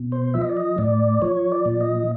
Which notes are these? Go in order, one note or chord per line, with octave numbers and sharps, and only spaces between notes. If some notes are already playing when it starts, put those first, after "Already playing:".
Already playing: B2
C5
F3 E5
D#5
D5
D#5
A2 D5
F3 C#5
D5
A#2
D#5